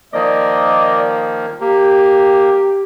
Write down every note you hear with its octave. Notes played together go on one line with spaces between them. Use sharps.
D#3 F3 A#3 D5 D#5
A#3 G4